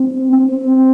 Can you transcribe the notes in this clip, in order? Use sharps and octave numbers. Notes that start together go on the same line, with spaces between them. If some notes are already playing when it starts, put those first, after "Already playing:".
Already playing: C4
C4